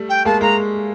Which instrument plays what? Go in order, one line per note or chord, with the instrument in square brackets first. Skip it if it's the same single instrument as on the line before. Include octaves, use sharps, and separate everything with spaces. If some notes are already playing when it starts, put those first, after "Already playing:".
Already playing: [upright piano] G3 A3
[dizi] G5
[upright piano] G#3 A#3 [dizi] A5
[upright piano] G#3 A#3 [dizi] A#5